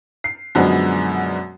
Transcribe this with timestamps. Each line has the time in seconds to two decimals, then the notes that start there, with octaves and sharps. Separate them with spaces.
0.24 C7
0.55 F#2 B2 D3 F3 G#3 B3